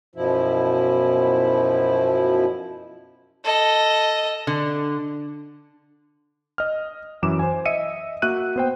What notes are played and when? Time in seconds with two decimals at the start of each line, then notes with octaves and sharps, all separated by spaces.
0.15 F#2 B2 F3 E4
3.44 A4 D#5
4.47 D3
6.58 D#5 F6
7.23 F#2 E3 D6 E7
7.39 C5 G#5
7.66 D#5 E5 C#7 D#7
8.22 A#3 F#4 E5 F#6 D#7
8.56 B3 C5 G5